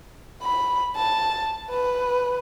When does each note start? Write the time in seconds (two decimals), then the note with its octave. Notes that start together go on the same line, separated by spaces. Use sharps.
0.43 B5
0.96 A5
1.70 B4